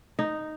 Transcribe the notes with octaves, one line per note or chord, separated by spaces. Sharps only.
D#4